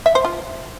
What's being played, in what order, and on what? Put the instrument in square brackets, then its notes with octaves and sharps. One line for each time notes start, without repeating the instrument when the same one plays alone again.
[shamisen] E5
C5
F4